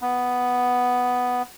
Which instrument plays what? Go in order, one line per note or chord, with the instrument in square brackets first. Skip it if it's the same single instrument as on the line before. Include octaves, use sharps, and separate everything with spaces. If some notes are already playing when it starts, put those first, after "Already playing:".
[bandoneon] B3